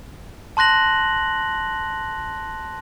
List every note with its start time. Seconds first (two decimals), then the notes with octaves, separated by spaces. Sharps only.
0.57 A5 C6 F#6 A#6 F#7